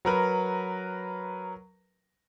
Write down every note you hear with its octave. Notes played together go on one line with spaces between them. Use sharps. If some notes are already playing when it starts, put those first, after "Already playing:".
F#3 A#4 B4